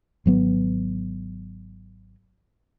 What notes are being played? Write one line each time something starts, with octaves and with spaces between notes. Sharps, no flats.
G#1 F#3 B3